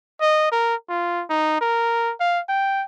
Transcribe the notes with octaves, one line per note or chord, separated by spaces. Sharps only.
D#5
A#4
F4
D#4
A#4
F5
G5